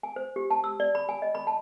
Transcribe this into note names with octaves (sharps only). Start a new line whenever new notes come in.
G#5
C5
G4
A5
E6
D5
B5
G#5
D#5
B5
A5